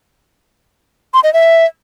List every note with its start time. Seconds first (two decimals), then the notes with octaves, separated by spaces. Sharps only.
1.14 C6
1.24 D#5
1.34 E5